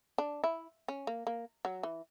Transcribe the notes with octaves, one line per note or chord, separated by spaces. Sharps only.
D4
E4
C#4
A#3
A#3
F#3
E3